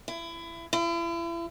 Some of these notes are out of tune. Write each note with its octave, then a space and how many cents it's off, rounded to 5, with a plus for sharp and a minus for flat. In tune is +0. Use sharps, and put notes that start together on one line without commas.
E4 +25
E4 +40